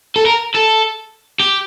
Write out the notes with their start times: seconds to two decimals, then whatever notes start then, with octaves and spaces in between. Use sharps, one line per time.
0.16 A4
0.26 A#4
0.54 A4
1.40 G4